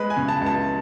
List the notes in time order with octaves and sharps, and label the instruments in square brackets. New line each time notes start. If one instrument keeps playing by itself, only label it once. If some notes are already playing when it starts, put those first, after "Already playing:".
Already playing: [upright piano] G#3 B4
G#5
C#3
A5
C#2
A5